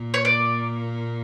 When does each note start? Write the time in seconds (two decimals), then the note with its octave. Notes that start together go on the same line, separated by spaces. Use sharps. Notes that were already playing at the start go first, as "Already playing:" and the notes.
Already playing: A#2 A#3
0.14 C#5
0.25 D5